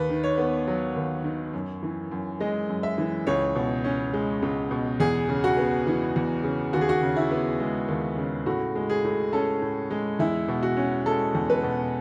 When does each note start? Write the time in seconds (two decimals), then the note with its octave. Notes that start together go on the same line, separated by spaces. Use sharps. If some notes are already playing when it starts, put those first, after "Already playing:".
Already playing: D#2 B4
0.09 D#3
0.23 C#5
0.38 B3
0.68 F#3
0.96 D#2
1.24 D#3
1.53 F#2
1.83 E3
2.11 F#2
2.40 G#3 D#5
2.69 F#2
2.83 E5
2.98 E3
3.27 C#2 C#5
3.55 B2
3.84 C#4
4.14 G#3
4.42 C#2
4.71 B2
5.00 E2 G#4
5.29 C#3
5.44 F#4
5.57 B3
5.87 E3
6.16 E2
6.44 C#3
6.73 D#2 F#4
6.81 G#4
6.89 F#4
7.02 C#3
7.16 E4
7.31 B3
7.60 G#3
7.88 D#2
8.18 C#3
8.46 A2 F#4
8.75 G#3
8.90 G#4
9.04 A2
9.33 C#4 A4
9.62 A2
9.91 G#3
10.19 E2 E4
10.48 B2
10.63 F#4
10.77 C#4
11.06 G#3 A4
11.35 E2
11.50 B4
11.63 B2